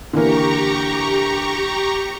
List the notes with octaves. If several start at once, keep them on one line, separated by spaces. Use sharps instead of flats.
D3 E3 A#3 G4 A#5 C#6